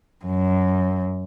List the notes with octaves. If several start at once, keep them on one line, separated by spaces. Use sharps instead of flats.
F#2